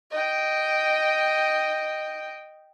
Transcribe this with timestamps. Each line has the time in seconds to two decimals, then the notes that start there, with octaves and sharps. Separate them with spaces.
0.11 D#5 G5